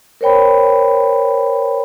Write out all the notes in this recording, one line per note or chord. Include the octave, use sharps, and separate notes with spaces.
A#4 C5 C#5 G5 B5